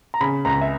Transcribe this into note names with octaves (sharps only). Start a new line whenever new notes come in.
A#5
C#3 B5
C#2 A#5
E5